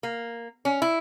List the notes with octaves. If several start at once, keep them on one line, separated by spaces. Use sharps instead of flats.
A#3
C#4
E4